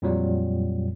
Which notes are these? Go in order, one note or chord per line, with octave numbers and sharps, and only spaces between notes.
F2 A#2 F#3 G3